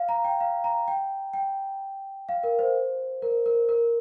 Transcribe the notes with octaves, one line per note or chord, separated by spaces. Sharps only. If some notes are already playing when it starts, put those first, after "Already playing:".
Already playing: F5
A#5
G5
F5
A#5
G5
G5
F5
A#4
C5
A#4
A#4
A#4